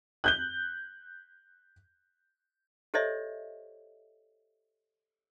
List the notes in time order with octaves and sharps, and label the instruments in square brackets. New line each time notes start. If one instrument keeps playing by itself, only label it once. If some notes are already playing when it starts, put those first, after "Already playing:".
[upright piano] F#6 G6 G7
[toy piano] G4 A4 C5 C#5 D#5 E5